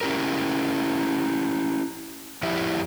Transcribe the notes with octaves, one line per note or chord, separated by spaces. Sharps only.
C#4 E4 G4 A#4
F2 F3 E4 G4 E5